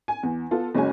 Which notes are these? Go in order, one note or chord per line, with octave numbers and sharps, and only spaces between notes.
G#5
E2
B3 F4 A4
F#1 G#3 C#4 F#4 G#5